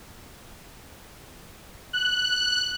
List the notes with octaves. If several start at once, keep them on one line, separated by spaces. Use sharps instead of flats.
F#6